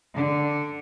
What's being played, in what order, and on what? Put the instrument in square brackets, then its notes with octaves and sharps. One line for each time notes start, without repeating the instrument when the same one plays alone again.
[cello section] D3